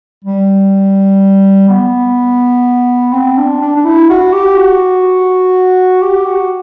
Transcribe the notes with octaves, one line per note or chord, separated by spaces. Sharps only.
G3
B3
C4
D4
D4
D4
E4
F#4
G4
F#4
G4
F#4